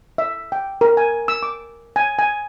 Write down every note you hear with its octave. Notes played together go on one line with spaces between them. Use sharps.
E5
G5
A#4
G#5
E6
D6
G#5
G#5